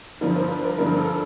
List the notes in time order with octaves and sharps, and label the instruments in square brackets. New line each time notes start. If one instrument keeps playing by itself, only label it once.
[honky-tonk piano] G2 D3 F3 A#4
C5
B4
A#4
G2 D3 F3 A#4
A4